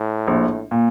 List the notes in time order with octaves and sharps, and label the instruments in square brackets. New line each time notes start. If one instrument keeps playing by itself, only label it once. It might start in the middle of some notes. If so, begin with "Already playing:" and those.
Already playing: [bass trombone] A2
[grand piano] A#1
A#2